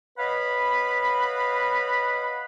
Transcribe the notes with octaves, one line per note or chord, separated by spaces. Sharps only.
B4 C#5 D#5 F5 F#5 B5